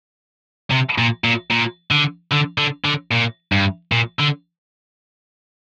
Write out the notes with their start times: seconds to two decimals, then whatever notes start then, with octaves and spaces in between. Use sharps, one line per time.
0.70 C3
0.98 A#2
1.24 A#2
1.51 A#2
1.91 D3
2.31 D3
2.58 D3
2.85 D3
3.12 A#2
3.52 G2
3.92 A#2
4.20 D3